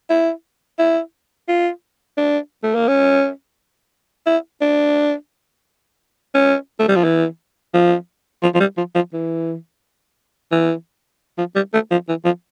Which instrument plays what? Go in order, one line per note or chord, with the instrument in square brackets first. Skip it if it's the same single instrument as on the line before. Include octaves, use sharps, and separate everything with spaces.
[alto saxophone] E4
E4
F4
D4
A3
A#3
C#4
E4
D4
C#4
A3
G3
F3
E3
F3
F3
F3
G3
F3
F3
E3
E3
F3
G3
A3
F3
E3
F3